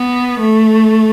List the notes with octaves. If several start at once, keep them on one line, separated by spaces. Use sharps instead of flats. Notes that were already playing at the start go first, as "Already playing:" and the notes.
Already playing: B3
A3